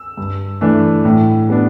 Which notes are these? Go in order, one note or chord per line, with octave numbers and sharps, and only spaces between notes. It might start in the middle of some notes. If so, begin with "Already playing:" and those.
Already playing: E6
G2
E3 A3 D4
A2
G3 B3 D4